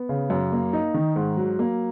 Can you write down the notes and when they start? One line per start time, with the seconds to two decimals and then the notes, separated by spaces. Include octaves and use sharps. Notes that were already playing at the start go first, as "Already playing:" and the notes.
Already playing: B3
0.09 C#3
0.30 F#2
0.52 A#3
0.73 D#4
0.94 D#3
1.16 G#2
1.37 F#3
1.59 A#3